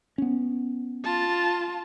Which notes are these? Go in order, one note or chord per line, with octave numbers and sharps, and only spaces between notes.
B3 C#4
F4 A5